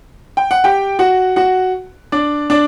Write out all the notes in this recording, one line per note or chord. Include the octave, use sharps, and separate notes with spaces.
G5
F#5
G4 G5
F#4 F#5
F#4 F#5
D4 D5
D4 D5